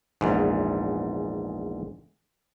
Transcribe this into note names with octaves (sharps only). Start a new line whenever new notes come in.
A#1 E2 G#2